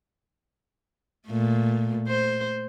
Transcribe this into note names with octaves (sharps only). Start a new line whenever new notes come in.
A#2 A3
C5